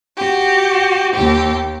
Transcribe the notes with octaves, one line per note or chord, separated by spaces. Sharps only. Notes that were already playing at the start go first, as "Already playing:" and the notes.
F#4 G4
D#2 G4